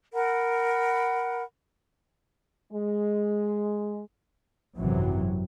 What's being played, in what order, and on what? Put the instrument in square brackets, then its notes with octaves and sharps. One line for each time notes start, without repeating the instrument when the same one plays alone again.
[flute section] A#4 F#5 B5
[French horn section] G#3
[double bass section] G#1 F#2 C3 E3 F#3